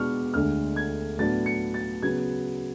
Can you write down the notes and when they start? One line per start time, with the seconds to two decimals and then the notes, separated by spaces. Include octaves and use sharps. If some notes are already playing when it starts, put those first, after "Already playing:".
Already playing: B2 G#3 B3 D4 C#6 F6
0.34 D2 D3 G#3 F6
0.76 G#6
1.18 A2 F#3 B3 D4 A6
1.46 C#7
1.74 A6
2.03 C#3 F#3 B3 G#6